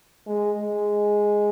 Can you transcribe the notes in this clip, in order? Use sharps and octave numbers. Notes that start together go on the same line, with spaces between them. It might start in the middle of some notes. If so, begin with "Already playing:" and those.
G#3
G#3